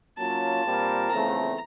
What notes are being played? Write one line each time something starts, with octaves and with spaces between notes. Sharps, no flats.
F#3 A#3 C#4 F4 A5
A#2 G3 C4 F4 A#4
E2 C#3 F3 A3 C4 A#5